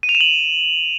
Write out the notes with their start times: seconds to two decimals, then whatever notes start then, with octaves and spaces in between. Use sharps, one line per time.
0.03 D#7
0.09 F7
0.15 E7
0.21 F#7